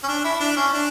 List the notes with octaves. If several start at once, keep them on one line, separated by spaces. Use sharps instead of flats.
C#4
D4
E4
D4
C#4
D4